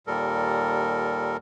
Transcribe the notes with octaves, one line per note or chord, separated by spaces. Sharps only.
D#2 A#2 G3 A4 A#4